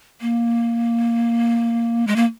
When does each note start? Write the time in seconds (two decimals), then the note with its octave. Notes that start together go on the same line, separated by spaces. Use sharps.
0.21 A#3
2.07 G#3
2.16 A#3